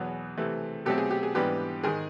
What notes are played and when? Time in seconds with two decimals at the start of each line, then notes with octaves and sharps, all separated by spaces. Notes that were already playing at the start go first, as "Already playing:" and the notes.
Already playing: E2 B2 F#3 B3 G#4
0.37 C3 E3 A3 C4
0.86 B2 F#3 A3 C4 G4 A4
0.98 G#4
1.11 G4
1.23 G#4
1.35 G#2 E3 G3 B3 D4 G4
1.83 G#2 D#3 G#3 G#4